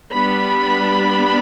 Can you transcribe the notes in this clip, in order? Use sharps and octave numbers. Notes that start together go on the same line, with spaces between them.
G3 B3 D4 B5